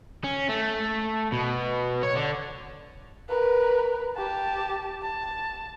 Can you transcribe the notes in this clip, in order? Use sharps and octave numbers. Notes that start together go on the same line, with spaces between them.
C#4
A3
B2
C#5
D3
A#4 B4
G4 A5
A5